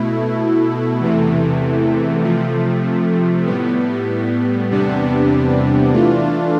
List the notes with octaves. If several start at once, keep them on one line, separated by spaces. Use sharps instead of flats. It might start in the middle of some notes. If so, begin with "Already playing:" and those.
Already playing: B2 A3 E4
E2 C3 E3 A3
C3 F3 A3
A2 G3 B3
E2 C3 G3 B3 D4
E3 A3 D4 F4